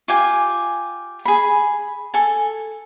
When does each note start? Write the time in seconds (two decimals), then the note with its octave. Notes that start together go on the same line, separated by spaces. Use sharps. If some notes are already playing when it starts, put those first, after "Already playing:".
0.08 F4 G4 G#5
1.25 G#4 B5
2.14 A4 G#5